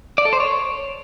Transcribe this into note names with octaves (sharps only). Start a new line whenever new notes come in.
D5
A4
C5
C#5